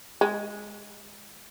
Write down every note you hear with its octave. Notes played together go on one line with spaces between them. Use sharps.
G#3